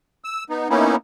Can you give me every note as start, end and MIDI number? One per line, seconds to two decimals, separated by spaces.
0.24 0.44 88
0.50 0.68 59
0.50 0.68 63
0.70 0.96 58
0.70 0.96 59
0.70 0.96 61
0.70 0.96 63
0.70 0.96 64